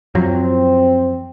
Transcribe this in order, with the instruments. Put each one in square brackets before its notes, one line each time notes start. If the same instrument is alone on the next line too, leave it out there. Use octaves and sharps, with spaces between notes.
[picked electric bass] F#2 F3 F#3 [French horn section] C4